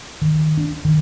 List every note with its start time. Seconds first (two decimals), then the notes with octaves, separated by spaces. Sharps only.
0.22 D#3
0.57 D4
0.85 D#3